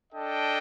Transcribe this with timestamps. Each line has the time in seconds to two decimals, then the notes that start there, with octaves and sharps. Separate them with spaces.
0.13 D4 A4 D#5 G5